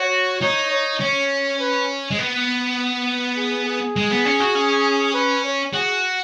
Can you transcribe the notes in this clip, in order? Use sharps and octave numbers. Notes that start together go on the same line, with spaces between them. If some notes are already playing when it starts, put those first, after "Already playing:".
Already playing: F#4 C#5
D#4 C#5
C#5
C#4 C#5
B4
G#3
B3
G#4
G#4
G#3
B3
C#4
F#4
C#4
B4
C#5
F#4 G#4